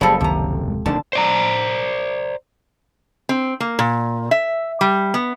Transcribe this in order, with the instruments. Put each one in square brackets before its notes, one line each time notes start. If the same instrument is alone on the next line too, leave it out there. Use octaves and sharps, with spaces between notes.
[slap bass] F#1 [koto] F3 A4 [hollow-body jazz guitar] G3 G#4 B5
[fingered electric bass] C#2 D#3 [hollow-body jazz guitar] C3 A#5
[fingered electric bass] D#1 G#3
[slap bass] F1 A#2 D#3 [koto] D3 [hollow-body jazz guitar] A5
[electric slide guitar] C5 D5 A#5
[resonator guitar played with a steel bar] C4
A#3
A#2
E5
G3
B3